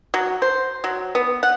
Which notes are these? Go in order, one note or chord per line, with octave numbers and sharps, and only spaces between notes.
F#3
C5
F#3
B3
F#5